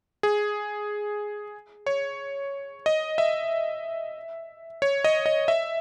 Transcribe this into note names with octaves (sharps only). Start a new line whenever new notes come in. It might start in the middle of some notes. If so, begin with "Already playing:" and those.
G#4
C#5
D#5
E5
C#5
D#5
D#5
E5